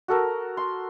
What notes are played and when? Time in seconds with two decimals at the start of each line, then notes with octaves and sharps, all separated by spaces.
0.08 F#4 A4 A#4
0.57 C6